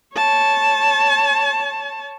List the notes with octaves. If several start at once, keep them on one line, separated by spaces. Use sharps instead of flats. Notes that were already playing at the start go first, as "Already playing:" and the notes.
C#5 A5